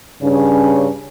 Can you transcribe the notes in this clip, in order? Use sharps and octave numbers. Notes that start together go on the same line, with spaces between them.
G2 C#3 C#4